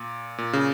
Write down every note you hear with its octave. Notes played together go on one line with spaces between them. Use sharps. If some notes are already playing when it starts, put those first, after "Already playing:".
Already playing: A#2
A#2
C#3